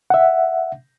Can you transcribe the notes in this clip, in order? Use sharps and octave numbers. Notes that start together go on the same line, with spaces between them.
E5 F#5